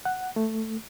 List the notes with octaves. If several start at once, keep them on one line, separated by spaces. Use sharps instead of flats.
F#5
A3